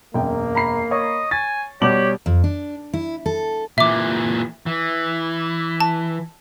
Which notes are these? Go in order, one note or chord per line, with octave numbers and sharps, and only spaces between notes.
E1 F#2 A#3 G5
A#5 B5 C7
C#5 D#5 C#6
G#5 A6
B2 G3 G4 C#5 D6 F#7
F2
D4
E4
A4
A#2 E3 E5 D6
E3
A5